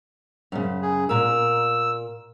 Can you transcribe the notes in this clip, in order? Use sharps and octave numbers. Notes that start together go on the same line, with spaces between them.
F#2 C#3
G#4
A#2 A#4 E6